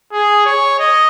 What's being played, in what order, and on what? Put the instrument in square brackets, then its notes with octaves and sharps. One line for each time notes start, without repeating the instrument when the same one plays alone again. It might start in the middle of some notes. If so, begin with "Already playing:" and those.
[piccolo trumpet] G#4
C#5
D#5